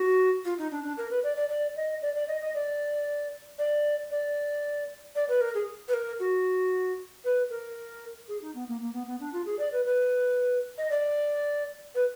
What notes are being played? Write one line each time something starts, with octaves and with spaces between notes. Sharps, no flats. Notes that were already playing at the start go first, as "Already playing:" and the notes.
Already playing: F#4
F4
D#4
D4
D4
A#4
B4
D5
D5
D5
D#5
D5
D5
D#5
D#5
D5
D5
D5
D5
B4
A#4
G#4
B4
A#4
F#4
B4
A#4
G#4
D#4
B3
A#3
A#3
B3
B3
D4
F4
G#4
D5
B4
B4
D#5
D5
B4